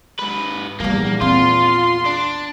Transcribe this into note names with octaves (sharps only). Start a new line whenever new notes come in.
G#2 B4
A#1 E2 F3 G3 A#3
C4 F4 C6
D4